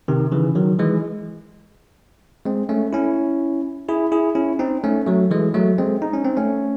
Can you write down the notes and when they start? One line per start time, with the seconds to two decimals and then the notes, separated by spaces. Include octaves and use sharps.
0.08 C3 D#3
0.32 C#3 E3
0.55 D#3 F#3
0.79 E3 G#3
2.46 G#3 C4
2.69 A3 C#4
2.93 C#4 E4
3.89 E4 G#4
4.12 E4 G#4
4.35 C#4 E4
4.59 C4 D#4
4.84 A3 C#4
5.07 F#3 A3
5.31 E3 G#3
5.54 F#3 A3
5.78 G#3 C4
6.02 D#4
6.14 C#4
6.25 C4
6.37 A3 C#4